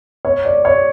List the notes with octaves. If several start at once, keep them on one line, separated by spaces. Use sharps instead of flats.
C#5
D5
C#5